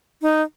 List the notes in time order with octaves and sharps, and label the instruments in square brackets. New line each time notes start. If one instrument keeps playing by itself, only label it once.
[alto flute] D#4